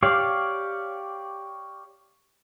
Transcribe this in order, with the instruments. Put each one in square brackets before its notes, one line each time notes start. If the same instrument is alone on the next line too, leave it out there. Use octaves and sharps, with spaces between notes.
[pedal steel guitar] G4 C#5 D5 F5